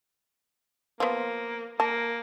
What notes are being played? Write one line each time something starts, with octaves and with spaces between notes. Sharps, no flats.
F3 A#3 B3
A#3 A5